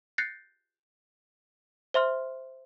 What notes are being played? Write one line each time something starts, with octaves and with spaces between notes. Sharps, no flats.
F#6 G6 A6 A#6 C7 C#7
C5 E5 C6 F6